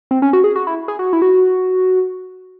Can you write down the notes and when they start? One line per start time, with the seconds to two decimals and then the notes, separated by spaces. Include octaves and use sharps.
0.11 C4
0.22 C#4
0.33 F#4
0.44 G#4
0.56 F#4
0.67 E4
0.88 G#4
0.99 F#4
1.13 E4
1.22 F#4